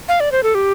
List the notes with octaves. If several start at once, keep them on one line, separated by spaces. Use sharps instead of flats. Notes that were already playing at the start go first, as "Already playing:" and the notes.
F5
D5
C5
A4
G4